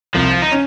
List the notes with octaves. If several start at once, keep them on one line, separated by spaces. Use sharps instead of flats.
C2 F3
D#4
C#4